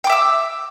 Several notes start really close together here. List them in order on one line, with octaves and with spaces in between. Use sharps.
G5 D6 E5 E6